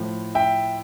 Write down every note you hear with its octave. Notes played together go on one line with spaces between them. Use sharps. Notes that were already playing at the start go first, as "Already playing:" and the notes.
Already playing: A2 F3 C5
E5 G5